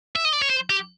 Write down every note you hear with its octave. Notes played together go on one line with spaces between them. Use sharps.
E5
D#5
D5
C#5
C5
G4